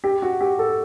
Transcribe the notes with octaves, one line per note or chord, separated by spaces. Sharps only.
G4
F#4
G4
A4